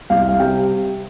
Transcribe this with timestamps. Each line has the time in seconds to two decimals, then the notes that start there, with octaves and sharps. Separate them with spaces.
0.10 C2 F5
0.29 F5
0.39 C3 G3 G5